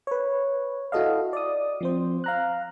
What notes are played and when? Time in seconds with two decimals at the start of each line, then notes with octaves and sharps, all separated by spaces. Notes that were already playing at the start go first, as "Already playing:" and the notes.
0.07 B4 C#5
0.92 E4 F#4 A4 D#5 F5
1.33 D5 D#6
1.81 F3 C4 C5
2.24 F5 A#5 F#6